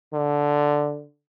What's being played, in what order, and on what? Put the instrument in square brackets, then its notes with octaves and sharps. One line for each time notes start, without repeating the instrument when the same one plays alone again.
[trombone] D3